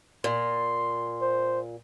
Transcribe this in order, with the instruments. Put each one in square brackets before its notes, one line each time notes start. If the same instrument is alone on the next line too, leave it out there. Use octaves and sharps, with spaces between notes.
[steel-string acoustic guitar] A#2 [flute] C6
[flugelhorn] C5